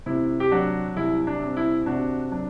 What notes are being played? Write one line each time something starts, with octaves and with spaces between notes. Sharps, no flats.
C3 E4
G4
F#3 D4 F#4
C2 E4
D4
C4
E4
C3 D4 F#4
F#3 D4